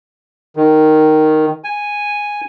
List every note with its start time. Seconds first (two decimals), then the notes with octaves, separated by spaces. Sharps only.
0.56 D#3
1.64 G#5